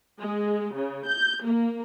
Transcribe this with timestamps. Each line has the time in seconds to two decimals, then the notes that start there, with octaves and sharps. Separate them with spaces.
0.21 G#3
0.75 C#3
1.08 G6
1.46 A#3